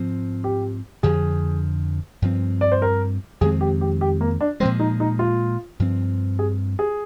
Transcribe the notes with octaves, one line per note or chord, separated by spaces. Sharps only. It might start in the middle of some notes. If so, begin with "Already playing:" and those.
Already playing: G#2 F3 C4
G4
F2 D3 F3 G#4
G2 F3 C4
D5
C5
A#4
F2 D#3 G#3 C4 G#4
G4
G4
G4
A#3
D4
A#2 F3 G#3 C4
D#4
D#4
F4
G2 F3 C4
G#4
G#4